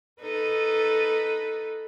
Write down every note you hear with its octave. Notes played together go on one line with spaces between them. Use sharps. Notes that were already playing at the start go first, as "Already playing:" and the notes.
D#4 A4 B4